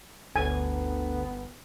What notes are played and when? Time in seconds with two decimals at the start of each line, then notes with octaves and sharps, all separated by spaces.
0.36 G1 D2 B3 G#5